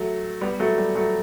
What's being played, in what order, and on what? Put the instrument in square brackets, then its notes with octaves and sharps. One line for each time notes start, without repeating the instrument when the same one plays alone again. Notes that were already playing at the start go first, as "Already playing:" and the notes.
Already playing: [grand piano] F#3 A3
G3 B3
F#3 A3
G3
F#3 A3